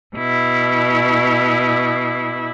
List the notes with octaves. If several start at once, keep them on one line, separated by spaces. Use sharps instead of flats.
B2 E4